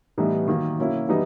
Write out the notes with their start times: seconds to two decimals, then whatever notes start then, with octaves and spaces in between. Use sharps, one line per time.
0.18 A2 E3 G3 B3 D#4
0.48 D#3 F#3 A#3
0.79 B2 F#3 A#3 C#4 E4
1.09 E3 G3 B3 D#4